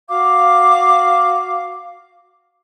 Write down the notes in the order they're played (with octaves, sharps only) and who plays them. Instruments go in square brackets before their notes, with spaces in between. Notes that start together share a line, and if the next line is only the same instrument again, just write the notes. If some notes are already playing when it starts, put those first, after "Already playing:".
[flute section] F#4 F5 D6